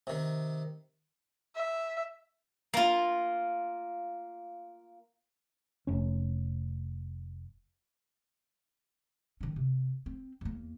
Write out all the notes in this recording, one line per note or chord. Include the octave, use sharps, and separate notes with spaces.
C3 D#3
E5
A#3 F4
F1 C#4
D#3 C#4
C3
C4
E2 A#3